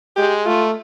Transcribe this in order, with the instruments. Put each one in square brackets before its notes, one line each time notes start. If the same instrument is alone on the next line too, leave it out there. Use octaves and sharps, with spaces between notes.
[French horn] G#3 [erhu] G4
[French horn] A3 [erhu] F4